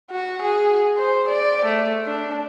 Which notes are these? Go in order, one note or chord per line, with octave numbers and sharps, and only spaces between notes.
F#4
G#4
C5
D5
A3
D4